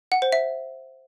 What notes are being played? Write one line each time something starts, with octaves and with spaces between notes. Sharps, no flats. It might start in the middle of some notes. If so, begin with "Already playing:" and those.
F#5
C5
E5